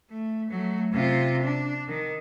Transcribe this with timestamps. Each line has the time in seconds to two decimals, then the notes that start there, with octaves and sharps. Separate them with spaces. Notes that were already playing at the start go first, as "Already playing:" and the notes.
0.10 A3
0.50 F#3 A3
0.93 C3 F4
1.43 D4
1.88 D#3